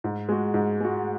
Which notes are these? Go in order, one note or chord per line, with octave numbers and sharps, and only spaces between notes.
G#2
G#3 F#4
G#2
G#3 F#4